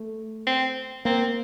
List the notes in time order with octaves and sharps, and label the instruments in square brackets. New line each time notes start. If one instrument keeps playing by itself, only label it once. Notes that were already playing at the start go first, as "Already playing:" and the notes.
Already playing: [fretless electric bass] A3
[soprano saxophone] C4
[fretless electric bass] A#3 [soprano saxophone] C4